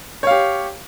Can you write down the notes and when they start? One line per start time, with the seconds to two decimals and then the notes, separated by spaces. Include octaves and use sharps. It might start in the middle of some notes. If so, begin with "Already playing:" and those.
0.23 C#5
0.27 F5
0.31 G4